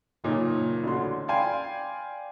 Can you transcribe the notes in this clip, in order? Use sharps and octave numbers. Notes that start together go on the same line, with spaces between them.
F#1 A#2 D#4 C#5
A1 D3 C#4 F#4 C6
D5 F5 G5 G#5 B5 C6